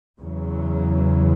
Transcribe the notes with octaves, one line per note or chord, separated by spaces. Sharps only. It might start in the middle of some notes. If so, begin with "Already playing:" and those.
E2 C#3 F#3